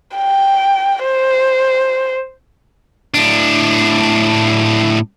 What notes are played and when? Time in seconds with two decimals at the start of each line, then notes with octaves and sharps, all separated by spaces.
0.16 G5
1.04 C5
3.14 A2 D4